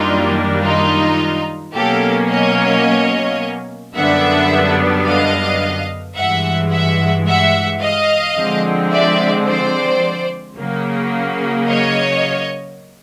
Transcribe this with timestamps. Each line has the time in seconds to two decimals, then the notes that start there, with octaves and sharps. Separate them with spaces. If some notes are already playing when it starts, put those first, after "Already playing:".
Already playing: F#2 D#3 G3 A#3 D4 D#4 F4
0.63 D#4 F4
1.74 B2 F#3 A#3 C#4 G4 A4
2.29 C#5 D#5
3.94 F#2 D3 G3 B3 D4 E5 F#5
5.05 D#5 F5
6.16 G2 E3 G#3 E5 F#5
6.70 E5 F#5
7.26 E5 F#5
7.81 D#5 F5
8.36 D3 F3 G#3 C4
8.91 D5 E5
9.47 C5 D5
10.57 C#3 F#3 A#3
11.67 C#5 D#5